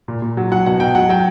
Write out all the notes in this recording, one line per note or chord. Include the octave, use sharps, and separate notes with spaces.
A#2
A#2
F#3
F#3 F#5
B2 F#5
B2 G5
F#3 F#5
F#3 G5